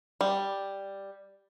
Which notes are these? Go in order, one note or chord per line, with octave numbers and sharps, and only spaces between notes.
G3